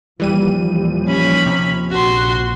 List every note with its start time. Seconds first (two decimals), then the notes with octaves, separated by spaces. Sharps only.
0.20 D#2 A#2 E3 F3 G3 D#7
1.07 C#4 B5
1.46 C3
1.90 A#1 F#4 C6